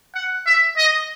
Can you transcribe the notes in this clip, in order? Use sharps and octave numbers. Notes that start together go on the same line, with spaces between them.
F#5
E5
D#5